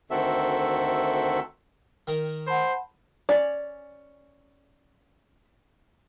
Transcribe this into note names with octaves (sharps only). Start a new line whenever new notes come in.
D2 D#3 C4 F#4 A4 E5
D#3 A#4 G5
C5 F#5 A5 B5
C#4 D5